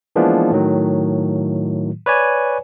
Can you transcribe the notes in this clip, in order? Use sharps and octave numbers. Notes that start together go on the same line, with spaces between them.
E3 F3 G#3 A#3 B3 D4
A2 D#3 F#3
B4 C#5 D5 G#5